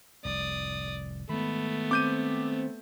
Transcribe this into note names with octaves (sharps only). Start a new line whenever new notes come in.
F1 C2 D5 D#6
D#3 G#3 A3 B3 B5
C4 D6 G6 D#7